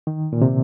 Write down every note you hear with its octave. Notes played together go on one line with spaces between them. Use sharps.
D#3
A#2
C3